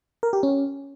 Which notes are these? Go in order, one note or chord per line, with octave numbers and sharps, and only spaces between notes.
A#4
G4
C#4